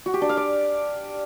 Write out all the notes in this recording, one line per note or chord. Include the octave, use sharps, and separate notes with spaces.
F#4
G4
D4
F5
D5